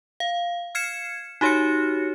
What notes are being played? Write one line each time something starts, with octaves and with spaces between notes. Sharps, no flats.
F5
F6 G#6 C7 C#7 E7
D#4 F#4 G4 C#5 F6 C#7